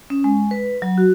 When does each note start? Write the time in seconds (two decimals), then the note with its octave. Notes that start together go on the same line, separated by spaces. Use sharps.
0.10 C#4
0.24 G#3
0.51 B4
0.82 F#3
0.98 F#4